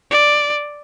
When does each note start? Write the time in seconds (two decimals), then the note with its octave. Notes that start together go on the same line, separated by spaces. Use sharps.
0.11 D5